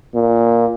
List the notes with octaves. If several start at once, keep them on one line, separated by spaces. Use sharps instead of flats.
A#2